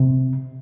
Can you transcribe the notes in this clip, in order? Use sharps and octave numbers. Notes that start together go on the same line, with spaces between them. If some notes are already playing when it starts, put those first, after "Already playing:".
Already playing: C3